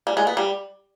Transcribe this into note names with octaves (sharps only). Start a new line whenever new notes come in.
G3
G#3
B3
G3